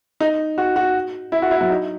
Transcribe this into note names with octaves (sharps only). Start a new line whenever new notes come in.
D#4
F#4
F#4
E4
F#4
E4
F#3
D#4